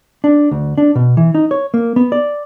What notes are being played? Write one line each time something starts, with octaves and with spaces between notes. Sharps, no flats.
D4
D2
D4
B2
E3
D#4
C#5
A#3
B3
D5